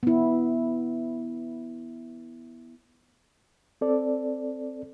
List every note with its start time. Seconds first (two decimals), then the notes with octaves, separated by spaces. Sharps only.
0.03 B3 E4
3.81 C4 A4 D5